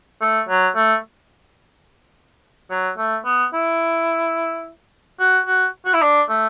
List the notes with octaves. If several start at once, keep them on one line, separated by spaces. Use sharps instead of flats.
A3
F#3
A3
F#3
A3
B3
E4
F#4
F#4
F#4
E4
D4
A3